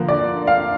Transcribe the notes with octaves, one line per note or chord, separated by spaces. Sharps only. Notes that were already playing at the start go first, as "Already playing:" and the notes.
Already playing: D3 F3 A#3
D5
F5